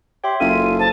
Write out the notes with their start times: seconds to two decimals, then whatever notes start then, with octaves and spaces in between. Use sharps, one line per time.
0.24 G4 C#5 E5 C6
0.40 F#1 F4 A4 D#7
0.79 F3 A5